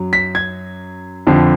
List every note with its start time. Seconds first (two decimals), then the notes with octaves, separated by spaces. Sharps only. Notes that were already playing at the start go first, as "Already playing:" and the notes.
Already playing: F#2 F#3
0.13 B6
0.35 G#6
1.27 F2 D3 F3